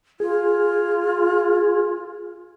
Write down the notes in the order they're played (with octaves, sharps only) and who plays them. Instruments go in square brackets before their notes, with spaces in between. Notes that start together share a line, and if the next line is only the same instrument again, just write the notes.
[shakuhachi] F4 [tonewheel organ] G#4